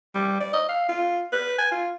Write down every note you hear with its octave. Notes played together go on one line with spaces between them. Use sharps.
G3
D5
D#5
F5
F4
B4
G#5
F4